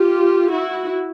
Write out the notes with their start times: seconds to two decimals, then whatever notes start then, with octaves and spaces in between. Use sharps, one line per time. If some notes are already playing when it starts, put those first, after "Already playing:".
Already playing: F4 G4
0.51 E4 F#4